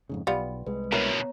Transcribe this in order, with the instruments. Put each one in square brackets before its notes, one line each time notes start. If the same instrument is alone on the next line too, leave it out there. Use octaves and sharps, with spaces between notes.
[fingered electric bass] F2 G#2 C#3
[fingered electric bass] B1 [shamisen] G3 B3 F4
[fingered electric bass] C2 G#3 [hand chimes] B4
[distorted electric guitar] D2 B2 [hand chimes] B3 C#5 A#5 [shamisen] E4 A#4